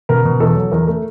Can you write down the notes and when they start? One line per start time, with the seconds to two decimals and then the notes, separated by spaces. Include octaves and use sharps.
0.09 B2 A#4
0.25 B2
0.40 E2 A4
0.56 F#3
0.71 E2 A#4
0.87 A3